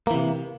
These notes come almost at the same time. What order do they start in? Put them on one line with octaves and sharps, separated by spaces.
A#3 E3 C3